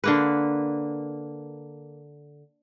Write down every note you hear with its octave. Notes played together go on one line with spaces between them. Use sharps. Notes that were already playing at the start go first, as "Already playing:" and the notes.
D3 A#3 B4